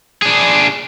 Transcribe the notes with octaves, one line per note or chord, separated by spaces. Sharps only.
D4 G#4